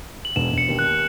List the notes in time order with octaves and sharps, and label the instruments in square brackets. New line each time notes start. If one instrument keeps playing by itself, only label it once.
[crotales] F#7
[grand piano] E1 [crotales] E7
[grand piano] E1
[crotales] C#7
[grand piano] D#2
[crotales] F#6